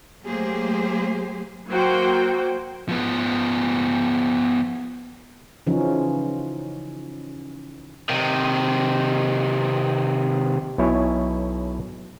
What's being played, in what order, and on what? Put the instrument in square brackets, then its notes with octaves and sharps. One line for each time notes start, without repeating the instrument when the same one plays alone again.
[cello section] F#3 A3 A#3 G4 G#4 C5
[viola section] F#3 A#3 F#4 C5 G5
[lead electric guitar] F3 B3
[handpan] C#3 E3 F3 C#4 D#4
[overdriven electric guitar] C3 D#3
[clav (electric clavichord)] B1 B2 E4 C#5 G#5